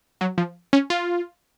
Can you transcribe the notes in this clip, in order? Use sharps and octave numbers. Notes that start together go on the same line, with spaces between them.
F#3
F3
C#4
F4